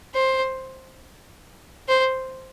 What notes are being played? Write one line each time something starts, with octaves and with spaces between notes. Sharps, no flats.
C5
C5